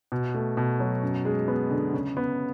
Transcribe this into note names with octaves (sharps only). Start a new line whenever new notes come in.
B2
A3
B2
F#3
F#2
G#3
B3
D3
C#3
B3